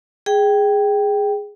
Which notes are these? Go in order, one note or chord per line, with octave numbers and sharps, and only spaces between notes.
G#4 G5